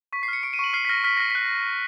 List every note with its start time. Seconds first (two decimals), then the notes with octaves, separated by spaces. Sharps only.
0.13 C#6 B6
0.23 C7
0.28 F6 C#7
0.43 C#6 D7
0.53 D#7
0.59 C#6 F#7
0.74 F6 C7
0.85 B6
0.89 F6 A#6
1.04 F6 B6
1.17 F6 A#6
1.30 F#6 B6